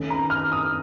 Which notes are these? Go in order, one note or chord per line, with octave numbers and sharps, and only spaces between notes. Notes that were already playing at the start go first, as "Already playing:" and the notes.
Already playing: D#2 D#3 A3 C#4
A#5
F6
D#6